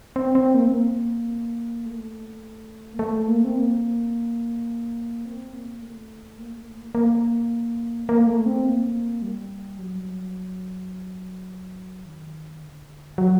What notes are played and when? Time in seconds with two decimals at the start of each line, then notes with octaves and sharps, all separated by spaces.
0.16 C4
0.35 C4
0.54 A#3
0.68 C4
0.73 A#3
1.86 A3
2.94 A#3
2.99 A3
3.28 A#3
3.45 C4
3.56 A#3
5.26 C4
5.53 A#3
5.82 A3
6.38 A#3
6.57 A3
6.76 A#3
6.95 A#3
8.09 A#3
8.27 A3
8.46 C4
8.65 A#3
9.22 G3
9.79 F#3
12.05 D#3
12.62 D3
13.18 F#3